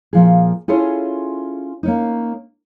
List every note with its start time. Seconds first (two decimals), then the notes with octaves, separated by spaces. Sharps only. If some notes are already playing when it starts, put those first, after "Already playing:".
0.13 A#2 F3 G#4
0.68 C#4 E4 F4 G#4 A4 C#5
1.83 A#3 C#4 D#4